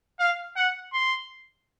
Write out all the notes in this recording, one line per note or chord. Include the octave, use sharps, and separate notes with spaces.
F5
F#5
C6